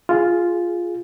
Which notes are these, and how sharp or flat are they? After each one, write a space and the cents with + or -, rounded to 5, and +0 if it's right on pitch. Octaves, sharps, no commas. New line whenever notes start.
F4 +0 G#4 +0